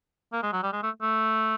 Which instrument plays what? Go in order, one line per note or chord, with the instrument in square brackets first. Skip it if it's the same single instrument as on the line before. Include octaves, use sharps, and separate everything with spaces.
[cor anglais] A#3
G#3
F#3
G3
G#3
A3
A3